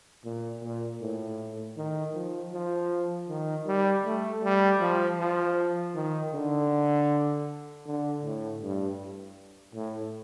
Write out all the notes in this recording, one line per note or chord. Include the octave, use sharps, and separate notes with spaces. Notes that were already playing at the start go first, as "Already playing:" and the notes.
A#2
A#2
A2
D#3
F3
F3
D#3
G3
A3
G3
F3
F3
D#3
D3
D3
A2
G2
A2